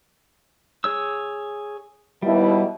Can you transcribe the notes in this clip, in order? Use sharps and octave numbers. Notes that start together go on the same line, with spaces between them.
G#4 C#5 E6
D#2 B2 G3 E4